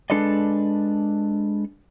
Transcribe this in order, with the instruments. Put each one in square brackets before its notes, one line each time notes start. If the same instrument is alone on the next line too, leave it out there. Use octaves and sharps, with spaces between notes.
[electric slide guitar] G#3 D4 A4 B4 D5 D#5